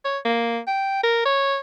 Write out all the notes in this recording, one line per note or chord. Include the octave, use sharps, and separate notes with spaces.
C#5
A#3
G5
A#4
C#5